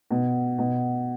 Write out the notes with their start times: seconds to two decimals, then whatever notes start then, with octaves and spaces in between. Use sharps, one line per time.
0.11 B2
0.59 B2